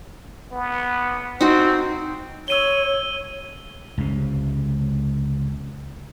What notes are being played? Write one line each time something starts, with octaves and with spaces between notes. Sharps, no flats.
B3
C4 D#4 F#4
C#5 E6 D#7 G7
C#2 C3